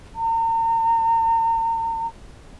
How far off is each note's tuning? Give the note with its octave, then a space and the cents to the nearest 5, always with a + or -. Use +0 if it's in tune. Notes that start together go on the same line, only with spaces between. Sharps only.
A#5 -40